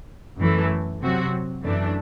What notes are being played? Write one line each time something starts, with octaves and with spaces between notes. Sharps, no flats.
F#2 E3 A3
C3 F#3 C4 F#4
F#2 E3 A3 D4